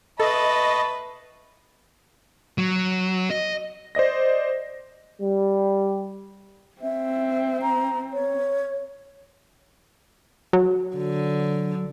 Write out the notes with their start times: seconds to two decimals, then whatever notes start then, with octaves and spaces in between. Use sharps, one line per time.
0.20 A4 B4 D#5 E5 A5 B5 C#6
2.58 F#3
3.30 D#5
3.95 C5 D5 D#5 A#6
5.21 G3
6.82 C4 E5
7.62 A#5
8.12 C#5
10.53 F#3
10.97 D3